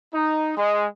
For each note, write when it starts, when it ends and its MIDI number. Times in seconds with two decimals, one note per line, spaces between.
0.13 0.52 63
0.57 0.84 56